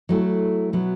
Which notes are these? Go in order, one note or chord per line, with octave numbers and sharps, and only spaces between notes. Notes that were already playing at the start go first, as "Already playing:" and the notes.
F#3 A3 E4
B2 F#3 B3 E4